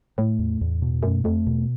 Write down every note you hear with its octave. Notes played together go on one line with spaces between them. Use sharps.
A2 A3
E2
E2
B2
F#2 A3
F2 A3
E2 B2